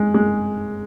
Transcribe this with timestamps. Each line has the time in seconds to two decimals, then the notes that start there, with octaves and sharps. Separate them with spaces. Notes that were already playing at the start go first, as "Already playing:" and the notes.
Already playing: G#3
0.14 G#3